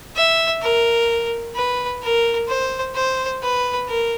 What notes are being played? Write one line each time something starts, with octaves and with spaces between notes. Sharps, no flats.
E5
A#4
B4
A#4
C5
C5
B4
A#4